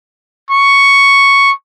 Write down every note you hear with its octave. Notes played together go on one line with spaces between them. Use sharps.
C#6